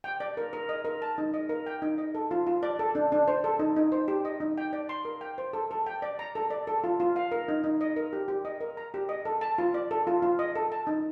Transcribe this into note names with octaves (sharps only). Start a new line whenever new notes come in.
G5
D5
A#4
A#4
D#5
A#4
A5
D#4
D#5
A#4
G5
D#4
D#5
A4
F4
F4
D5
A4
D4
D4
C5
A4
D#4
D#4
C5
G4
D#5
D#4
G5
D5
C6
A#4
G5
C5
A4
A4
G5
D5
A#5
A4
D5
A4
F4
F4
F5
A#4
D#4
D#4
D#5
A#4
G4
G4
D#5
A#4
A#5
G4
D#5
A4
A5
F4
D5
A4
F4
F4
D#5
A4
A5
D#4